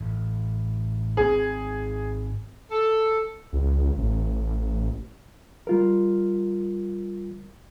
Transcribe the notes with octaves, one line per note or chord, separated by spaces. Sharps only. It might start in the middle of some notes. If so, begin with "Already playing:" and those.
A1
G#1 C4 G#4
A4
C#2
A1
G3 F4 A#4